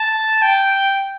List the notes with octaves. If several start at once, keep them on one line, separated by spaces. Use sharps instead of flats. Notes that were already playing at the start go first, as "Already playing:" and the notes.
Already playing: A5
G5